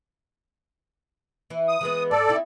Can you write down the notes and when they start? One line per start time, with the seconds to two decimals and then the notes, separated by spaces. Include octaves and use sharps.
1.50 E3 E4
1.68 D#6
1.81 E3 G#3 B3
2.11 G#2 A4 D5
2.28 C4 D#4 E4